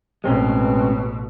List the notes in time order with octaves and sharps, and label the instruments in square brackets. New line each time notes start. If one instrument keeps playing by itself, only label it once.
[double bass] A1 B2 [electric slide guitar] G#3 C4 C#4